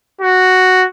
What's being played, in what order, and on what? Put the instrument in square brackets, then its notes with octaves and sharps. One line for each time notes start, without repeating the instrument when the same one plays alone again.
[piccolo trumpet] F#4